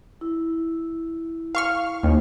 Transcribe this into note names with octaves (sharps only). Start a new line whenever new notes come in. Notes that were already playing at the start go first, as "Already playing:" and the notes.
E4
F5 C#6 F6
D#2